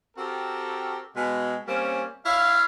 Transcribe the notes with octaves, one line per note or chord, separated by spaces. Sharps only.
C4 F#4 G4 A4 A#4
B2 G#3
G3 A#3 C4 C#4
E4 C#5 F5